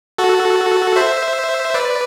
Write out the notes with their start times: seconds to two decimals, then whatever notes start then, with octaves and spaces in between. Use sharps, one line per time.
0.18 F#4 A4
0.96 C5 E5
1.74 B4 D5